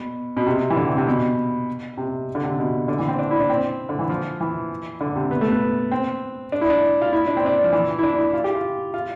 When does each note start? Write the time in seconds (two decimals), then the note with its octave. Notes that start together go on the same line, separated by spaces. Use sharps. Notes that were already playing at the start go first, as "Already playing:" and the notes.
Already playing: B2
0.37 B2
0.47 C3
0.70 E3
0.77 D3
0.87 C3
0.97 C3
1.07 B2
1.97 C3
2.35 D3
2.43 C3
2.59 B2
2.88 D3
2.99 E3
3.08 C4
3.19 D4
3.31 E4
3.40 D4
3.50 C4
3.89 D3
3.99 E3
4.09 F3
4.41 E3
5.01 D3
5.16 C3
5.31 B3
5.41 A3
5.52 B3
5.92 C4
6.52 D4
6.61 E4
6.70 D4
7.02 F4
7.13 E4
7.27 D4
7.37 C4
7.46 D4
7.64 F3
7.73 E3
7.99 E4
8.03 D4
8.18 E4
8.34 F4
8.44 G4
8.55 F4
8.94 F4